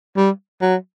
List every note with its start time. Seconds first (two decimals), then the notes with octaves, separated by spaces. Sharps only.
0.16 G3
0.61 F#3